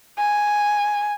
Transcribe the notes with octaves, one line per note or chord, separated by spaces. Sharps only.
G#5